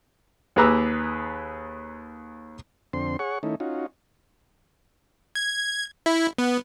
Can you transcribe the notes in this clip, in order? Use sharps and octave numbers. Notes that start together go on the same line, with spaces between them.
D#2 G#4 B4 A#5 D6 E6
F2 D3 C4 C6
G#4 C#5 F#5 C#6
D#3 A3 C#4 D#4 E4
C#4 D#4 F4 F#4
G#6
E4
B3